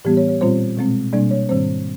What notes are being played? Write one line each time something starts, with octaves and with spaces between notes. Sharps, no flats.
A2 E3 G3 B3 G4
C#5
C#5
A#2 G3 C4 F4 C5
B2 G#3 C4
B2 G3 A#3 D4 D5
C#5
G#2 D#3 G3 C4 C5